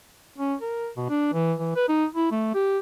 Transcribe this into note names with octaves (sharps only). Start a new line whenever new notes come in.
C#4
A#4
B2
D4
E3
E3
B4
D#4
E4
A3
G4